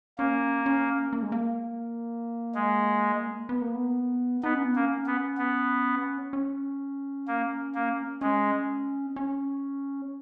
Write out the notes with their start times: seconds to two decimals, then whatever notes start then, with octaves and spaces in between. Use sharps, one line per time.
0.18 A#3 C#4
0.66 C#4
1.13 A#3
1.22 G#3
1.32 A#3
2.55 G#3
3.49 B3
3.62 A#3
3.75 B3
4.43 B3 D#4
4.55 C#4
4.65 B3
4.76 A#3 C#4
5.06 B3
5.38 B3
6.33 C#4
7.28 A#3
7.75 A#3
8.21 G#3 C#4
9.16 C#4